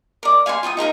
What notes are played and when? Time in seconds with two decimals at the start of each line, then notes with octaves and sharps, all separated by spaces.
0.23 A#4 D5
0.46 F5 G#5 B5 C6
0.63 F4 G5 A#5 D#6
0.77 D#4 A#4 F5 A#5